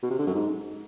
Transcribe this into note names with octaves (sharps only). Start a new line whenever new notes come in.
B2
C3
D3
F#2
G#2